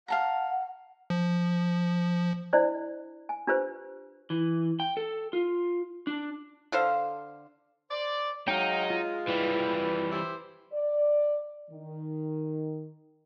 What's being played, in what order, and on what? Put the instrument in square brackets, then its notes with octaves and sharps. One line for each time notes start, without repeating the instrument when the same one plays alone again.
[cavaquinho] F5 A5 A#5 [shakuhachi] F#5
[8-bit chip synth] F3
[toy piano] D4 E4 C5 D5 D#5
G#5
D4 F4 G4 B4 C5
[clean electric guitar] E3
G5
A4
F4
D4
[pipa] D3 A4 C5 F5
[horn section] C5 D5
[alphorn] F#3 [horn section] G#3 [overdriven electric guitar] D#4 [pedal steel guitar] F5 G5
[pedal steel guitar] F4
[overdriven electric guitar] E3 G3 [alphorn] B4
[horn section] E4 G4 C5
[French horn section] D5
D#3